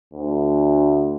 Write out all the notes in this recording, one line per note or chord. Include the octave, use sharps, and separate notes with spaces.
D2